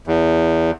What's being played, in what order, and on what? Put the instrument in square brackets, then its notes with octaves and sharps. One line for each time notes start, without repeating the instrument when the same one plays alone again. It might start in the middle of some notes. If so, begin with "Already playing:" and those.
[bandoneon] E2